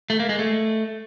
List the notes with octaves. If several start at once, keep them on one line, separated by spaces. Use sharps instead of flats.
A3
A#3
G#3
A3